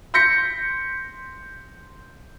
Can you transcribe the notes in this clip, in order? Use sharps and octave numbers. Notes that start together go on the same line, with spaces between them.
C6 G6 A#6 B6 C#7